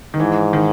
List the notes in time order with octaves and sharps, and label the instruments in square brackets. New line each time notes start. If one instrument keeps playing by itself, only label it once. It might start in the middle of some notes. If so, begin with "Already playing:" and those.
[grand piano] D#3
[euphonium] G#2 [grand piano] E3
[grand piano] D#3